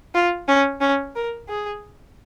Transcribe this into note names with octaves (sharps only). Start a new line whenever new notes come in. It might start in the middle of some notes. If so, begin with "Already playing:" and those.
F4
C#4
C#4
A#4
G#4